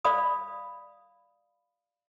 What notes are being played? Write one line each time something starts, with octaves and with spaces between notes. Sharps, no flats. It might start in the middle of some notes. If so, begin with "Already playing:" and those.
D5 F5 B5 D#6